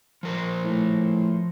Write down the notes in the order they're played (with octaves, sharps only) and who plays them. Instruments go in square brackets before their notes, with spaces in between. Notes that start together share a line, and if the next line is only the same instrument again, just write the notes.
[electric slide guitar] F3 A#4 C5
[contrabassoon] A2